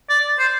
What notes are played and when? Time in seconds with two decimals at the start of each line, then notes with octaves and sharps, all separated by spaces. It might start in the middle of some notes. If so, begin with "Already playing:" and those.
0.09 D5
0.39 C5